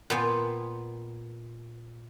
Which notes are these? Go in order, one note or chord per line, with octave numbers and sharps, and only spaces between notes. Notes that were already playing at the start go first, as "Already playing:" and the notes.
A#2 B3 G5 G#5